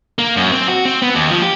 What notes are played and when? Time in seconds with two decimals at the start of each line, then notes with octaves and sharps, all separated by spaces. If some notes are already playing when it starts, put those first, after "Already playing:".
0.19 A#3
0.36 F#2
0.52 C4
0.68 F#4
0.85 C4
1.02 B3
1.15 D#2
1.31 F3
1.42 G4